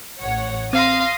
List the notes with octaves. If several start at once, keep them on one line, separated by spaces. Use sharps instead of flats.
A1 C#5 F#5
C4 F5 C6 D#6 A#6